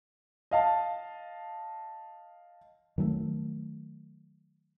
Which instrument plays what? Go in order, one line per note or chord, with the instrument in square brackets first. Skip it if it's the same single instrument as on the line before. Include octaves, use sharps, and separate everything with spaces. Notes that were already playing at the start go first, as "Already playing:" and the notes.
[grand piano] D#5 F5 A5
[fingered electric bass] D#3 F#3 G#3 A3